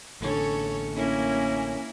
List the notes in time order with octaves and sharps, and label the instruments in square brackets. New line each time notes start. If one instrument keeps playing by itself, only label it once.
[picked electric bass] A1 D3 [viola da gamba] C#4 A4 C#5
[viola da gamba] A#3 E4 A#4 [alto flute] C#4